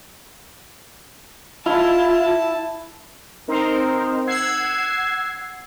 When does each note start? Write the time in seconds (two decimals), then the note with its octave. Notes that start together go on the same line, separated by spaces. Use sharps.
1.66 E4 F4 A5
3.48 C4 D#4 A#4 C5
4.27 F#5 E6 G#6 C7